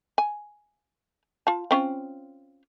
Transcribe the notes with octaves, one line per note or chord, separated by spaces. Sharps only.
G#5
F4 A5
C4 C#4 F4